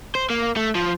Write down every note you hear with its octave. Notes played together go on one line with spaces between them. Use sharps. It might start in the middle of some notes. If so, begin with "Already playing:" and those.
C5
A#3
A3
F3